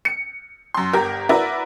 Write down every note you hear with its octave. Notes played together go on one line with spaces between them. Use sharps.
C#7
F#2 C6
G1 G4 A#4
E4 F#4 A#4 B4 D5 E5